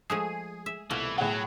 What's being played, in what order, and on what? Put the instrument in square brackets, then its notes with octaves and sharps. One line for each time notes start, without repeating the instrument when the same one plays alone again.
[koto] F3 G#3 A3 [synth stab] G#4 D#7
[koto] E5
[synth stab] C2 [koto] B2 A3 F4 [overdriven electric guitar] E3
[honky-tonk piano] A2 G#4 F#5 [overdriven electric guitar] F#3